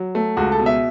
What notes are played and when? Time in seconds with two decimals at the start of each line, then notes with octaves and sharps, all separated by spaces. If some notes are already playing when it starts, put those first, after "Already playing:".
Already playing: F#3
0.15 A3
0.37 C#2 F#4
0.52 A4
0.59 B2
0.66 E5